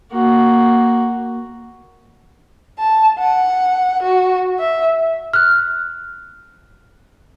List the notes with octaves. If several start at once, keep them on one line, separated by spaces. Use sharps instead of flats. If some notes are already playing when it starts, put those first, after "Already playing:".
A#3 F#4
A5
F#5
F#4
E5
F6 F#6